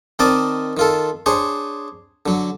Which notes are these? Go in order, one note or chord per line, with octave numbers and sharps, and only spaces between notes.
D#3 C4 A#4 D5 D#5 A5
D#3 F4 A4
D4 G#4 C5 C#5
D3 F#3